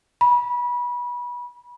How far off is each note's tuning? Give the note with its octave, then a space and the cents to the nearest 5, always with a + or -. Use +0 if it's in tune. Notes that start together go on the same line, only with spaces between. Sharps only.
B5 -25